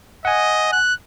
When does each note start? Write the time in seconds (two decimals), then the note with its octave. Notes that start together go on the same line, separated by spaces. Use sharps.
0.25 D#5 F#5 G#5
0.72 F#6